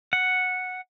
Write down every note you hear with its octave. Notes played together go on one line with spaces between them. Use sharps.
F#5